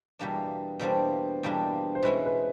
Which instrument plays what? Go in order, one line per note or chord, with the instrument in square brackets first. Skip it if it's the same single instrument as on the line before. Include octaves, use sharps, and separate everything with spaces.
[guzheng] E2 B2 G3 A#3 D4
[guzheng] E2 B2 G3 A#3 D4 [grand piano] C5
[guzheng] E2 B2 G3 A#3 D4
[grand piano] C5
[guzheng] B2 G#3 C#4 E4 [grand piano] B4
[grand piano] B4